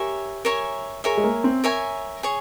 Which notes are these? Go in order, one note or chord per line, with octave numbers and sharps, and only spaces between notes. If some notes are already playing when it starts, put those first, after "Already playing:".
Already playing: G4 A#4 C#5 E5 G#5
A#4 C#5 E5 G#5
G#4 A#4 C#5 E5 G#5
G#3
A#3
C4
A#4 C#5 E5 G#5
G#4 C#5